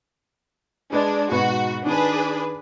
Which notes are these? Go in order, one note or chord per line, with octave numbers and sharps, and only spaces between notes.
G#3 D4 B4 D5
G#2 B2 F#4 B4
D#3 D4 G#4 B4